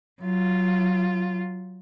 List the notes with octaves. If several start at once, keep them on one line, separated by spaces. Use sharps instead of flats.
F#3 F4